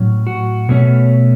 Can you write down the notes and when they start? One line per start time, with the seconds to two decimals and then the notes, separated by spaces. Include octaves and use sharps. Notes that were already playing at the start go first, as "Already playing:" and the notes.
Already playing: A2 F#3 C#4
0.27 F#4
0.69 B2 A3 C#4